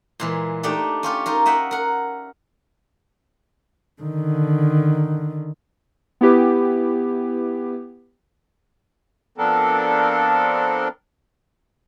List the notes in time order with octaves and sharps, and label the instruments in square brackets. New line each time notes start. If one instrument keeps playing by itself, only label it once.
[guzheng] A#2 E3 G#3
A3 D4 D#4 G4 D5
C#4 F4 G4
D#4 F4 A#4
D#5 E5 F#5 G5
A#4 F#5
[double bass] D3 D#3
[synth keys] B3 E4 G4 B4
[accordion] F3 B3 C4 D4 A4 A#4